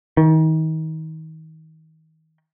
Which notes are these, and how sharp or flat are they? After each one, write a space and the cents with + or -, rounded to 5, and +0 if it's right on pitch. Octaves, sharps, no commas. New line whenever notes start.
D#3 +35